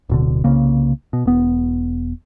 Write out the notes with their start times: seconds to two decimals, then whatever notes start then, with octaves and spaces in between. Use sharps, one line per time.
0.09 D1 B2 D3
0.44 C2 C#3 A#3
1.13 B2
1.25 E1 B3